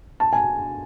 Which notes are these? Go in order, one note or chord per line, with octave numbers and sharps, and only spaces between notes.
A5
G#5